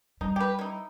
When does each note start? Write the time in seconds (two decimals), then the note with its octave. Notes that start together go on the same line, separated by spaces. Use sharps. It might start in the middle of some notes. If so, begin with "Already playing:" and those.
0.21 G3 D#4
0.36 G4 B4
0.59 D#4 E4